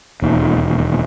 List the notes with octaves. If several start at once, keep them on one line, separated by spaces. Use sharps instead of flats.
E1 D#2 D#3